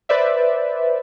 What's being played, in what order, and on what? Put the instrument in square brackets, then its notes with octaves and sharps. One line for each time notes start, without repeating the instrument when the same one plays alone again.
[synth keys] B4 C5 D5 E5